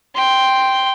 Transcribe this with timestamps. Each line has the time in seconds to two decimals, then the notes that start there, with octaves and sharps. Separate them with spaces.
0.15 G5 C6